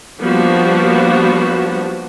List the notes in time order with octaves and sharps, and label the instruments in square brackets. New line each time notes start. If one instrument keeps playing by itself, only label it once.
[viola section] F3 G3 A#3 B3 D4 F#4